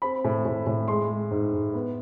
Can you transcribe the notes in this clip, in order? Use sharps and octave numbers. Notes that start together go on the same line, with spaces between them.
C4 B5
A2
A2
A2
G#3 C6
G#3
G#2
G#2
B3